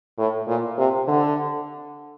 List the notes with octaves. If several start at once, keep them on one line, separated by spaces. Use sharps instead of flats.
A2
A#2
C3
D3